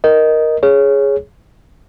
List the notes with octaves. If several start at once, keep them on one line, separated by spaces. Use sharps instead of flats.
A#4 D#5
G#4 C#5